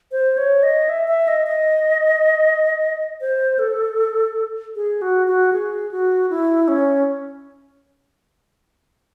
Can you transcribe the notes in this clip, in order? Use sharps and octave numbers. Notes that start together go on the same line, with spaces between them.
C5
C#5
D#5
E5
E5
D#5
D#5
C5
A4
G#4
F#4
F#4
G#4
F#4
E4
C#4